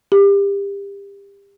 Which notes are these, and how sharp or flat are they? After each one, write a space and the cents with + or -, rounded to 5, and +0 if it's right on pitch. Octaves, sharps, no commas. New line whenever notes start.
G4 +30